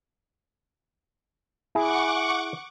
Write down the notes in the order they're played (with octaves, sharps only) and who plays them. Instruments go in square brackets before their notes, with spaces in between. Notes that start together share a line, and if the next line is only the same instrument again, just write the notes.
[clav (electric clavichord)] E4 G#4 [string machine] F#5 C#6 D6